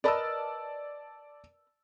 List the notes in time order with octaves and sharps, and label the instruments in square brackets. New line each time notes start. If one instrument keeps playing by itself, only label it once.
[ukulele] A#4 B4 D#5 [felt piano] D5 A5 E6